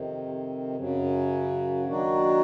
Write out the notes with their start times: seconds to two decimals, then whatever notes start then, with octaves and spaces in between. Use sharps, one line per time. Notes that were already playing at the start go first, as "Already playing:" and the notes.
Already playing: F2 C3 D#3
0.76 F#2 C#3 F#3
1.85 D#3 F#3 A#3 D4 F#4